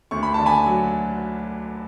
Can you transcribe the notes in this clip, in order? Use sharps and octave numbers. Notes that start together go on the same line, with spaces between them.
D2 C#6
B5
D3 A5
G#5 B5
F#3